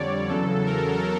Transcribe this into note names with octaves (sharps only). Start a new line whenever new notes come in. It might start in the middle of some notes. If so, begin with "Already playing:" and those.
Already playing: F2 D3 G3 C#5 D5
E2 C#3 F#3 A4
A#4